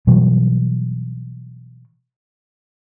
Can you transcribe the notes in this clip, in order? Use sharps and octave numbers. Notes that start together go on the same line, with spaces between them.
B2 E3 F#3 G3